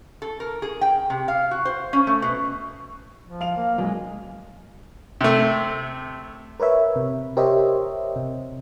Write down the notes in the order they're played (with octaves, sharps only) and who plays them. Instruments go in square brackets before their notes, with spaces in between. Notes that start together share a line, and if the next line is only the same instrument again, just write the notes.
[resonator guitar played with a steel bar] A4
A#4
G#4
G5
C3
F5
F#4
C5
C#4
A3
B2
[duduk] F3
[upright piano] F5 F7
[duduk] A#3
[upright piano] B1 F#2 [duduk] G#3
[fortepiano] C3 A3
[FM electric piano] A#4 B4 C#5 E5
C3
G4 A#4 C5 C#5 D#5 E5
C3